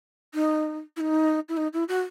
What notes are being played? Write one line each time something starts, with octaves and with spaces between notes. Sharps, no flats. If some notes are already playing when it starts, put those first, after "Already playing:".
D#4
E4
D#4
E4
D#4
E4
F#4